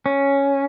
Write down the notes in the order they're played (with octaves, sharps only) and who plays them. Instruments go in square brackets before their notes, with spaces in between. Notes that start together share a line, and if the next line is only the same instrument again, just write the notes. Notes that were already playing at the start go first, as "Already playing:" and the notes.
[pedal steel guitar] C#4